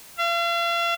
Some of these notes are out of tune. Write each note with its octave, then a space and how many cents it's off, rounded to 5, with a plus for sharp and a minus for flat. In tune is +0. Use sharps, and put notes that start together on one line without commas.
F5 -40